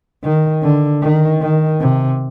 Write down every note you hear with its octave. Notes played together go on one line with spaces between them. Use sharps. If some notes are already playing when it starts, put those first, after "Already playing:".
D#3
D3
D#3
D#3
C3